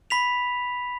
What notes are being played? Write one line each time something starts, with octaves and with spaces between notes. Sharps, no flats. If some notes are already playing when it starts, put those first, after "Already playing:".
B5 B6 F7